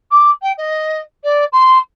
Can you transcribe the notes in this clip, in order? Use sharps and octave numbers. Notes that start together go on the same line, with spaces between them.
D6
G5
D#5
D5
C6